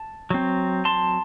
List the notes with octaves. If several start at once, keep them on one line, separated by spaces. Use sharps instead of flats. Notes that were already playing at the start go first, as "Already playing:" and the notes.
Already playing: A5
F#3 C4
A5 C6